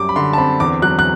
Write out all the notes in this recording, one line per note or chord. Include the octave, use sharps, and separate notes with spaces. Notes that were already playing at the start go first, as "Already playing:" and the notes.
Already playing: F#2 G3 D6
B5
D3 C6
A5
C4 B5
E2 D6
F#3 F#6
F#6